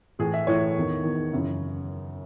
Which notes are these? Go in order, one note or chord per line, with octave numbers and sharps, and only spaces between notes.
A2 E3 G#4
E5
A2 E3 C#5
E2 D#3
E2 D#3
F#2 C#3 E3